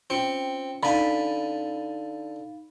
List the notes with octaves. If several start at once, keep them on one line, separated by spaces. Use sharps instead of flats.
C4 C#4 F4 C#7
D3 D#4 F5 G#5 B5 A6